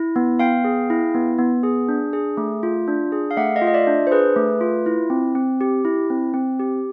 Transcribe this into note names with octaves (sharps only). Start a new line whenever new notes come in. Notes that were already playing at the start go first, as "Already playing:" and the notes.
Already playing: E4
B3
B3 F5 G5
G#4
E4
B3
B3
G#4
D4
G#4
A3
F4
D4
G#4
F5
A3 E5 F#5
D#5 F5
F4
D#5
D5 E5
D4
C5
G#4 B4
A3
F4
E4
C4
C4
G4
E4
C4
C4
G4